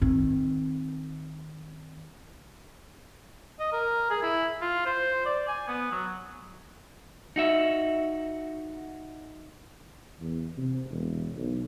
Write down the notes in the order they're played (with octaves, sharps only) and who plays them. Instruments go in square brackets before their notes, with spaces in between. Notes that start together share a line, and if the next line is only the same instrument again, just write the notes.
[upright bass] D#3 C4
[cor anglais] D#5
A#4
G#4
E4
F4
C5
D5
G#5
B3
F#3
[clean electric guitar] D#4 F#4 E5
[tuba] E2
C3
E1
B1